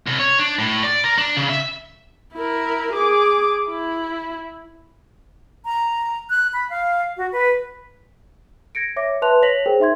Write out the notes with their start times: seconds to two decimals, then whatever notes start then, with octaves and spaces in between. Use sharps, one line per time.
0.07 C2
0.19 C#5
0.39 D4
0.59 A2
0.83 D5
1.04 A#4
1.18 D4
1.37 C#3
1.49 E5
2.34 E4 A#4
2.93 G#4 D6
3.69 E4
5.65 A#5
6.30 F#6
6.53 B5
6.70 F5
7.17 F#4
7.32 B4
8.75 G#6 A#6 C#7 D7
8.96 C#5 E5 D6 A#6
9.22 B4 E5 A5 C6 F#6 F7
9.42 C#5 A#6 B6 F7 F#7
9.66 G#4 A#4 C5 G5
9.80 D#4 E5 C6 G#6